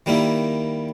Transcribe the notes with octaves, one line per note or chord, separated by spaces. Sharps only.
D#3 G3 A#3 E4